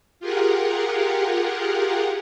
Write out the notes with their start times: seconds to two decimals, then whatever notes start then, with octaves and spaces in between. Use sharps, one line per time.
0.20 F4 G4 G#4 A#4 F#5